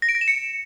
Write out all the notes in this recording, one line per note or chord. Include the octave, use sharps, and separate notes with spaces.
A#6
D7
A#6
E7
C#7